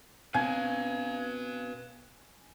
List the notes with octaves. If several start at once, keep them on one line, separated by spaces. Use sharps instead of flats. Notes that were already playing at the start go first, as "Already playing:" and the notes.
B2 C4 B4 F5 G#5